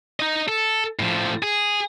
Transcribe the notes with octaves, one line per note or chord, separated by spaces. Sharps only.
D#4 D#5
A4
A2 F3
G#4